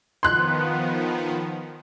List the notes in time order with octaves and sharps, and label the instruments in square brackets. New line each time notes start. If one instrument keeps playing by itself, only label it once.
[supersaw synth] D#3 F3 B3 [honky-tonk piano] C6 F#6